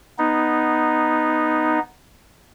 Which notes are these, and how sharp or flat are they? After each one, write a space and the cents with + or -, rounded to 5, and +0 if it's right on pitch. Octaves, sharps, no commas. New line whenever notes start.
B3 +0 D#4 -5